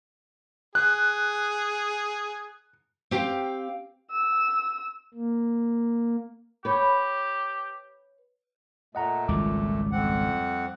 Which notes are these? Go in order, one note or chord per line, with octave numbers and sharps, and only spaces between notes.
G#4 F#6
C4 G4 F5 G5
E6
A#3
G4 B4 C#5
A#2 A3 D#5 F#5 A#5
G#1 C#2 F#2 G3 D6
F2 C4 F#5